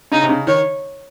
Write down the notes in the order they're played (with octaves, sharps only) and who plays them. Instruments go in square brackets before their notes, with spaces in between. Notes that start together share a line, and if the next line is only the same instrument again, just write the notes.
[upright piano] C#3 [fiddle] D#4
[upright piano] C3
C#3
[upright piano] D#3 [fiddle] C#5